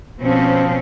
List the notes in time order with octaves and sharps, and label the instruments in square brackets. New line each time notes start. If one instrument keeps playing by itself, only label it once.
[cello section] B2 C4 C#4 [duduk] F3